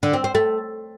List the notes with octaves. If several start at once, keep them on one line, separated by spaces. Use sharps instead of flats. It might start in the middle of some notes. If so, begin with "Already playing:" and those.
D3
C4
C4
A3